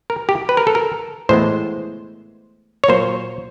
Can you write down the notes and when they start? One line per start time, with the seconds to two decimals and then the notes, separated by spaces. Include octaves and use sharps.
0.10 A#4
0.29 G4
0.49 B4
0.57 A#4
0.67 A4
0.75 A#4
1.29 A2 E3 G#3 B3 C5
2.84 C#5
2.88 A#2 F#3 A#3 C5